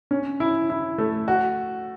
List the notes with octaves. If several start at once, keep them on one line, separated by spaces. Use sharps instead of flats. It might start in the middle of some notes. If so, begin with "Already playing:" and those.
C#4
E4
E4
A3
F#4